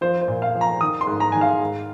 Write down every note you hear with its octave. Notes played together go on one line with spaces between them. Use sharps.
F3 C5
C5
A#2
F5
F3
A#5
D#3 D#6
C6
G#2
A#5
D#3 G#5
F5
G#2